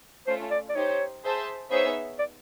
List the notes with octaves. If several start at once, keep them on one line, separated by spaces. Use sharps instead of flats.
A3 C#4 F4 C5
D5
D5
D#4 G4 C5 C#5
G#4 C5 E5 A5
B3 D#4 G#4 C5 C#5 E5
D5